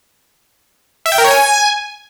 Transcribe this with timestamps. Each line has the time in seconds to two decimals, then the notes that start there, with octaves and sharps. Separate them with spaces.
1.06 E5
1.12 G5
1.18 A#4
1.24 C#5
1.31 G#5